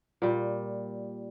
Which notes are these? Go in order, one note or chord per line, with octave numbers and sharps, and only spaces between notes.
A#2 G3